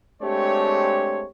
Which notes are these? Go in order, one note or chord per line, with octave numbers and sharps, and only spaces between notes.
G#3 A3 C4 D4 G4 C#5